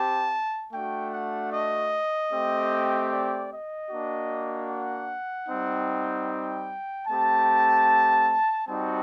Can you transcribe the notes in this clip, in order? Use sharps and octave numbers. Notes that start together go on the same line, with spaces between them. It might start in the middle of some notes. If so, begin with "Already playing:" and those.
Already playing: C4 G4 A5
A3 D4 F#4 G5
F#5
D#5
A3 C4 G4
D5
D#5
A#3 D4 F#4
F#5
G3 C4 D#4
G5
A3 C4 G4 A5
G3 C4 D#4 F#4 A5